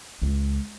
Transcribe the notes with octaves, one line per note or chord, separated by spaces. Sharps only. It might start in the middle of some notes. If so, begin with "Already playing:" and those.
C#2